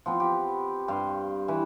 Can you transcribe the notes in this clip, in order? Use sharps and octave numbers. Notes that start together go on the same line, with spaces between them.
F3 B3 C4
G4
G2 F5 C6
E3 B4